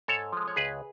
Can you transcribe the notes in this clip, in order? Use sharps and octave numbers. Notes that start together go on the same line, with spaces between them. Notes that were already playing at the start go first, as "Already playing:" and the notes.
G#2 A4 C#5
F3 G#3
C#5
C#2 G#4 B4